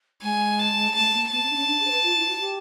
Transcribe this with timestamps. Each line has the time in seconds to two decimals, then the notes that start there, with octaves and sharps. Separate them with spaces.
0.22 G#3 G#5
0.59 A5
0.95 A3 A5
1.13 A#3
1.31 B3 A5
1.43 C4
1.50 D4
1.55 C#4
1.67 D4
1.79 G#4
1.87 C5
1.91 B4
2.03 F4
2.16 E4
2.27 F#4
2.39 G4